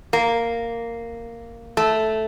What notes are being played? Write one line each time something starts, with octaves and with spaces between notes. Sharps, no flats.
A#3
A3